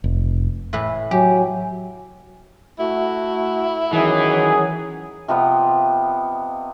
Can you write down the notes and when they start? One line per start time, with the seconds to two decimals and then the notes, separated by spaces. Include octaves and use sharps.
0.04 F1
0.73 A2 E3 B4
1.11 F#3 G4 G#5
2.79 A3 E4 F#4
3.93 D#3 E3 F#3 C#4 G#4
5.28 C3 F3 B3 D#5